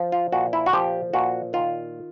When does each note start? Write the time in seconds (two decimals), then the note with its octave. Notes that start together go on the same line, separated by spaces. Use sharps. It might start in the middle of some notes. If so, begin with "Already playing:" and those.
Already playing: F3
0.12 F4
0.32 A#2 F#4
0.53 E4
0.66 F#4
0.73 F3 G4
1.13 A#2 F#4
1.53 D#3 F4